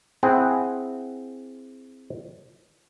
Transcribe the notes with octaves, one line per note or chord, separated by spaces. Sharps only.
C4 E4 G#4 F#5 G5